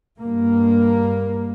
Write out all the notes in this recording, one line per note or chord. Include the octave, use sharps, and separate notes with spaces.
G2 A#3